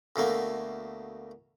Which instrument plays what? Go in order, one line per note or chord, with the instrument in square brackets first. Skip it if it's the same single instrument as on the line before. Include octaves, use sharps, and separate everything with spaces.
[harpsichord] D2 B2 A3 A#3